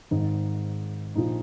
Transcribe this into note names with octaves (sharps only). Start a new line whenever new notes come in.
G#1 G#2 D#3 D#4
A#1 A#2 F3 D#4